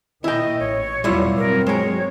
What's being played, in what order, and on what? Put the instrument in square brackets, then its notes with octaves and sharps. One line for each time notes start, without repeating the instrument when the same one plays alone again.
[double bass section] A#2 D#3 [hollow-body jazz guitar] E4 G5 [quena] D#5
[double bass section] A1 [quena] C#5
[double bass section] E2 B2 F#3 [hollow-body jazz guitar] G3 E4 F4
[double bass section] G2 F#3 C4 [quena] A#4
[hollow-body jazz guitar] G#3 A#4 [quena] C#5